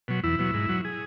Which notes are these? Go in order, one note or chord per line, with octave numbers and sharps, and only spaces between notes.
B2 F#3
E2 E4
B2 F#3
G#2
F#3
G#4